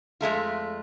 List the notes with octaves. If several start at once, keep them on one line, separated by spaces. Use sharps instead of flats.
F2 G#3 A3 F4